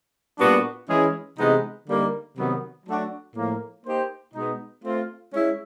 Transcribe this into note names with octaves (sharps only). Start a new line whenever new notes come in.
A#2 G3 B3 D4 F#4
E3 G#3 C#4 E4 G#4
C3 E3 G#3 B3 D#4
D3 G3 A#3 D#4
C3 D#3 F#3 B3
F#3 A3 D4 F#4
A2 F3 A#3
A#3 D#4 G4 C5
B2 G#3 B3 D#4
A3 C4 F4
G#3 C#4 E4